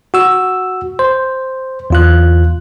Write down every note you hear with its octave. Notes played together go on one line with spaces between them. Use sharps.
F#4 E6
C5
E2 F4 F#6